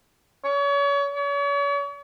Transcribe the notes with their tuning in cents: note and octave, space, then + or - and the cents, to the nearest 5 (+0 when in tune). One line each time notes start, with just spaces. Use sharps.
C#5 +35
C#5 +40